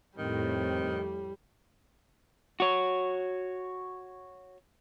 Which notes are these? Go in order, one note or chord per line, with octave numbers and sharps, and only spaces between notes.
F2 A2 D#3 G3 C4
F#4 C#5